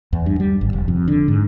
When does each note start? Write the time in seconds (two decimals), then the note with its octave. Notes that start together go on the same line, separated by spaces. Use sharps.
0.13 E2
0.26 G2
0.40 G3
0.61 G#1
0.73 F1
0.88 F2
1.08 D3
1.28 G#2